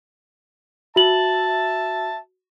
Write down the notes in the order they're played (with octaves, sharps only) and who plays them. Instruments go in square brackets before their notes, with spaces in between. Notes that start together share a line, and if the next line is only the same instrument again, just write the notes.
[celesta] F#4 F#7 [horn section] E5 A5